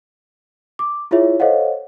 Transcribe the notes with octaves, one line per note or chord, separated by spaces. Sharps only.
D6
E4 F4 G#4 C#5 E5
A4 C5 C#5 D#5 F5 F#5